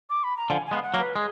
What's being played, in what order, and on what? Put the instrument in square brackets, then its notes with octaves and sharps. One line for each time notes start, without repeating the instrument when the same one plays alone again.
[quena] D6
B5
A#5
[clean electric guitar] D3 F3 [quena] G#5
[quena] G#5
[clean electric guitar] G#3 B3 [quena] F5
[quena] F#5
[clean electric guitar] F#3 A#3
[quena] B4
[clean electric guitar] G#3 [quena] G#4